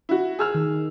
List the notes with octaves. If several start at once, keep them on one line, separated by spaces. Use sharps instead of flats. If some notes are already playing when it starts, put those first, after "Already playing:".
E4 F#4
G#4 E6 F6
D#3